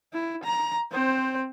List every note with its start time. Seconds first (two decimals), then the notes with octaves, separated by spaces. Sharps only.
0.14 E4
0.44 A#5
0.91 C4 C5